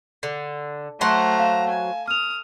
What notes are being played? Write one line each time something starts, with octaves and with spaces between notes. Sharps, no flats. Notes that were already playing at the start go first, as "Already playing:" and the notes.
D3
F#3 A3 C5 F#5 A#5
F5 E7
G#5
D#6 F6 F7